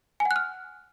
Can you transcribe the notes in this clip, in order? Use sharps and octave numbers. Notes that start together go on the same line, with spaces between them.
G#5
F#5
F#6
F6